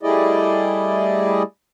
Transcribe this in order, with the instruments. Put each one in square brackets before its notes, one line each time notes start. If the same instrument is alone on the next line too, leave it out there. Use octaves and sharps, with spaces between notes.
[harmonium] G3 A3 E4 G#4 D5 D#5